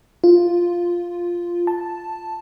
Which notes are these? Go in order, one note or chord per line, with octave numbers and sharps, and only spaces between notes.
F4
A5